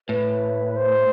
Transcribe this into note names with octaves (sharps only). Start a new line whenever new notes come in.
A2 B4
C5